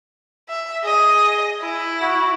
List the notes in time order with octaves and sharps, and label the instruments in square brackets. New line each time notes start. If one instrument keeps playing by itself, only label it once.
[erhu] E5
[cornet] G#4 [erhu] D#5
[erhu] E4
[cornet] F#4